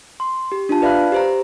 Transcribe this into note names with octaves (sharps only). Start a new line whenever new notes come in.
C6
G4
D4 F4 A5
B4 D5 E5 F5 B5 F#6
G4 C5 A#5